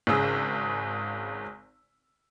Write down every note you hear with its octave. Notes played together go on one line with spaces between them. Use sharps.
G#1 C#3 E6